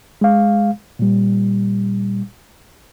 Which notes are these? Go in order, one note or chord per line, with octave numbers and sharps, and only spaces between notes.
G#3 F5
A#2 G3